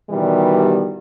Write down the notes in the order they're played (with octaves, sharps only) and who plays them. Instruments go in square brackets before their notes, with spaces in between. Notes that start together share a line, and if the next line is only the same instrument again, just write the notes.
[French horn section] B2 D#3 E3 G3